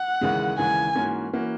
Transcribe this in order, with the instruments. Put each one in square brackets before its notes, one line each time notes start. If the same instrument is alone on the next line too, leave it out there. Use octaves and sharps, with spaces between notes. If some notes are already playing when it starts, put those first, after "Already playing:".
Already playing: [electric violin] F#5
[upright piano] D#2 C#3 E3 G#3
[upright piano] D#2 C#3 E3 G#3 [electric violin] G#5
[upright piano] G#2 E3 A#3 C#4 F#4
E3 A#3 C#4 F#4